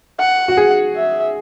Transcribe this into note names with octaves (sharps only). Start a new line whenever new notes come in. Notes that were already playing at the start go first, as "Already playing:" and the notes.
F#5
F#4
G#4
E5